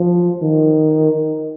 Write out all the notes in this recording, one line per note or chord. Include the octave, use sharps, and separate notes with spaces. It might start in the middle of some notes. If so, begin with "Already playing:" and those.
Already playing: F3
D#3